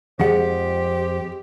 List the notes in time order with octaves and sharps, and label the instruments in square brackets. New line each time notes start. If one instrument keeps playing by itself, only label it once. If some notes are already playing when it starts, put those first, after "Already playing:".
[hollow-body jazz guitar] F2 F3 F#5 [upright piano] G#3 [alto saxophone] G4 [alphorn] C5